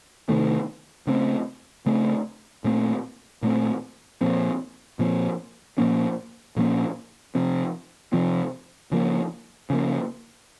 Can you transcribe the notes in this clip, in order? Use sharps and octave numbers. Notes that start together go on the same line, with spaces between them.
C3 D#3 A3
C#3 A3 C4
C#3 A3 C4
A#2 A3 C4
A#2 A3 C4
A#2 F3 C4
A#2 F3 C4
A#2 F3 A#3 C#4
A#2 F3 A#3 C#4
C3 F3 C4
C3 F3 C4
C#3 F3 A#3
C#3 F3 A#3